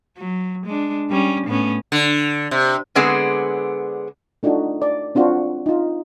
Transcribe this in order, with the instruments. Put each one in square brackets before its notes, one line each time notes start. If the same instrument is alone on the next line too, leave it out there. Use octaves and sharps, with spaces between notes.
[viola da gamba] F#3
G#3 D4
G3 C#4
A2 B3 C#4
[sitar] D3
C3
[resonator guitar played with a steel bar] D3 G#3 B3 C4 G#4 D5
[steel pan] A3 D4 D#4 F4 F#4
D5
C4 D4 F4 F#4 C5
D#4 F4